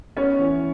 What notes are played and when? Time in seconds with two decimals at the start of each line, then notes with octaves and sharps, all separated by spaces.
0.17 B3 C#4 C#5
0.39 E3